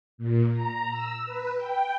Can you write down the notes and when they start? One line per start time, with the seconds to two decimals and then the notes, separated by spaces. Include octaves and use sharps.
0.18 A#2
0.52 A#5
0.91 E6
1.26 B4
1.55 G5